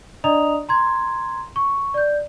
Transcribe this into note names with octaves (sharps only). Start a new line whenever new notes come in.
D4 D5 D#5 A#5 D#6 F7
A#5 C6 G#6
C#6
D5 G6